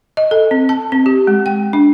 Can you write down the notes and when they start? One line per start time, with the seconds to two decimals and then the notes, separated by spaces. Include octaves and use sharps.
0.17 D#5
0.31 A4
0.51 C4
0.69 A5
0.92 C4
1.06 G4
1.27 G#3
1.46 G5
1.73 D4